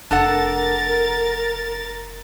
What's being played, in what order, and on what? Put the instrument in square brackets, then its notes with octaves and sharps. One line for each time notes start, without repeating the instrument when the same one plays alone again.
[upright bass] F1 [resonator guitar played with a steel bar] D4 A4 F#5 [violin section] A#4 A6